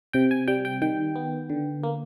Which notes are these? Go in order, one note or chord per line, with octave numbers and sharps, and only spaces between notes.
C3 G5
G#5
G3 G5
G5
D#3 G5
B3
D3
A#3